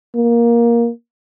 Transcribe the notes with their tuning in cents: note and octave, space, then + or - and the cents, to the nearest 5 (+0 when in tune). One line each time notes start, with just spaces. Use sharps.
A#3 +10